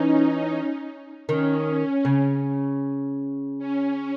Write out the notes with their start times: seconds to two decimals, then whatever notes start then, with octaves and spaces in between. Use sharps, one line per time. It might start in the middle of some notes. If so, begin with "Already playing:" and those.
Already playing: E3 C#4 D#4
1.29 D#3 C#4
2.05 C#3
3.59 C#4